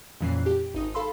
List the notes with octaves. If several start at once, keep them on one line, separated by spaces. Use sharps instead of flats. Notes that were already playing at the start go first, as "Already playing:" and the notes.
F2 A#2 E3 C#4 F#6 C7
G4
G#1 D#4 D#6
A4 F5 B5 C6 E6